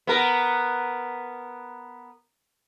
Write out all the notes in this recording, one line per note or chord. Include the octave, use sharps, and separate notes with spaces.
B3 A#4